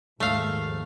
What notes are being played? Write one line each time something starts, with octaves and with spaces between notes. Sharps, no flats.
D#2 G#2 F3 A3 F5